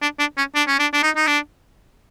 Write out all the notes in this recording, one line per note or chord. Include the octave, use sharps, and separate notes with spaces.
D4
D4
C#4
D4
C#4
D4
D4
D#4
D#4
D4